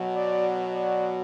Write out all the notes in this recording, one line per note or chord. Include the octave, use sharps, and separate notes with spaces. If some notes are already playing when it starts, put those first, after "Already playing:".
Already playing: B2 F#3
D5
D5